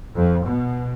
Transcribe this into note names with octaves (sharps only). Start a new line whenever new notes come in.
F2
B2